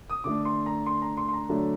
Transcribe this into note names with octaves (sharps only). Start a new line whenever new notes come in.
D#6
D3 A3 D4 D6
C6
A#5
C6
A#5
C6
C6
A#5
D3 F#3 A3 D4